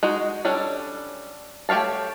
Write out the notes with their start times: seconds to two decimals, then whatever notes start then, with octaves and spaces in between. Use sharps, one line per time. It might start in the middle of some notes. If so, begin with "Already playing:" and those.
0.03 G#3 D#4 F#4
0.45 G3 C#4 D4 A4
1.69 A3 G4 C#5 F5 A5